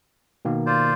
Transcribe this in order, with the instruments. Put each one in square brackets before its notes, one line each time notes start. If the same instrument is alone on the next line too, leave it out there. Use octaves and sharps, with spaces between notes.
[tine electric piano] B2 D#3 A#3
[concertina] F4 C5 D5